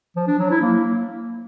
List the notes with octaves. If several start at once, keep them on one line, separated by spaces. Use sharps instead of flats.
F3
D4
F#3
E4
A#3